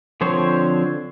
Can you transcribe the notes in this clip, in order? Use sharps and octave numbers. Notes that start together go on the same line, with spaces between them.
D3 F3 C4 C5 C#5